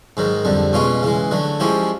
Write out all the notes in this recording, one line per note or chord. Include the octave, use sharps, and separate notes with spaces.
G#2 D#3 F#3
F2 D3 G3
B2 G#3 C#4 F4
C#3 E3 G#3
D3 F#3 A3
F3 G#3 C#4 E4 G4